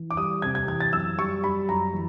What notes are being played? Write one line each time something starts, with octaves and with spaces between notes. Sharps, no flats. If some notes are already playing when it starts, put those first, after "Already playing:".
Already playing: E3
D6
G3 D#6
C3 G#6
G#6
E3 G#6
A6
F#2 E6
G3 C#6
G3 B5
F#2 A#5
E3